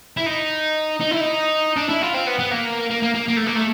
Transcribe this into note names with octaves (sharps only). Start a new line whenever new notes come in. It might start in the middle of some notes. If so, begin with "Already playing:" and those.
E4
D#4
D#4
E4
D#4
D4
E4
F4
C4
B3
B3
A#3
A#3
A#3
A#3
A#3
A3
A#3
A3